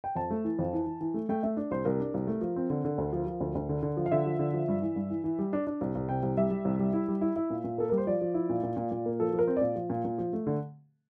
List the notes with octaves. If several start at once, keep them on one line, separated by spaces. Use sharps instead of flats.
G5
F2 A5
A3
E3
F2
E3
E3
E3
A3
A3 G5
A3 E5
D4
C2 C5
C2 A#4
D4
C2
A3
F3
C4
D3
D3
D2
F3
F3
D2
D2
D3
D3
F3
F5
D3 E5
F3
D3
F3
G2
E3
G2
E3
E3
G3
D4
D4
C2
C2
C3 G5
C2
G3 E5
G3
C2
G3
E4
G3
E4
E4
A#2
A#2
A#3 A4
G3 A#4
C5
F3 D5
F3
E4
A#2
A#2
A#2
A#2
A#3
F3 A4
F3
A#4
C4
A#2 D5
F3
A#2
A#2
F3
A3
D3